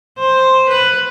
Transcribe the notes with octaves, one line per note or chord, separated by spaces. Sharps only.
C5
B4